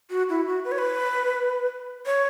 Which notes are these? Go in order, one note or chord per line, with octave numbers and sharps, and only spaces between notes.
F#4
E4
F#4
B4
C#5
B4
C#5